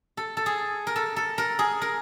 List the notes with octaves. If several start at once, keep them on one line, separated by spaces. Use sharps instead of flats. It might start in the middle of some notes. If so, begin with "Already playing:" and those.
A4
A4
G#4
A#4
A4
A4
A#4
G#4
A#4